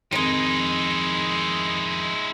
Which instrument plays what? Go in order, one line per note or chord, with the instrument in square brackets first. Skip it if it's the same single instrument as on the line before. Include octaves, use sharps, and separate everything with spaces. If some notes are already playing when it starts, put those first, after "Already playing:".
[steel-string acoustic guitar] F2 D#3 [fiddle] G#3 [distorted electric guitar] D#4 E4